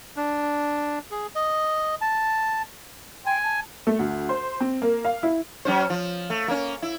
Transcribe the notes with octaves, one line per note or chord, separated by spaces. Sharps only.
D4
G#4
D#5
A5
G5 G#5 C6
A5
A3
D2
C5
C4
A#3
F5
E4
F#3 C#4 C5
F3
A3
A#3 C#4
E4